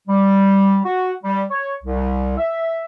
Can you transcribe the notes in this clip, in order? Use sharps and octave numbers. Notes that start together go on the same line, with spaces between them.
G3
F#4
G3
C#5
C2
E5